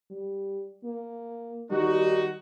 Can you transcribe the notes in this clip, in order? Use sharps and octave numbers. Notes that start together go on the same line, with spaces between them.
G3
A#3
D#3 G3 D#4 F#4